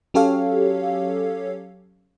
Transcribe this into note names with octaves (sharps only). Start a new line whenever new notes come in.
F#3 C#4 G4 A4 C#5 F5